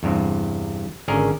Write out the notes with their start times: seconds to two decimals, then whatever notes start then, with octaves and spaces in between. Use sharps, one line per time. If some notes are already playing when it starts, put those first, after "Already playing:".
0.03 E2 G2 C3
1.08 G#1 D3 C#4 G#4 A#4